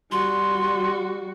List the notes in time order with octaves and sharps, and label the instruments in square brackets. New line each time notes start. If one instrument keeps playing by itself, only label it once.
[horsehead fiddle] G3 F#4 [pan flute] C6